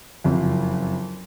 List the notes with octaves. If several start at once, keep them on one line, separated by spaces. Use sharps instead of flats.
F#1 F2